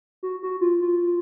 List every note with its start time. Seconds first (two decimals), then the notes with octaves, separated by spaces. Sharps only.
0.23 F#4
0.43 F#4
0.61 F4
0.81 F4